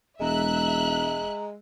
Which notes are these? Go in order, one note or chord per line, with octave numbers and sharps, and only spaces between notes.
E1 G#3 E5 A#5 F#6